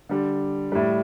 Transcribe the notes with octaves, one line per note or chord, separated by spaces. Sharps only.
D3 G3
A2 G3